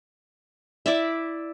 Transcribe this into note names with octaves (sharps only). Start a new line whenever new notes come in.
E4 D5 E5